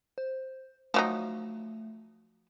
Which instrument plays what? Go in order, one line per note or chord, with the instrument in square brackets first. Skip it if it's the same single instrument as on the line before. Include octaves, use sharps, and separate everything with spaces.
[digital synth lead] C5
[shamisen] F3 F#3 D#4 [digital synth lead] A3